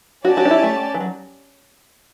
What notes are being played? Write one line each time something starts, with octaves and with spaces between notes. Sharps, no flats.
C#4 F#4 G4 D5 A5
F#4
D4
E4
A3
E3
F#3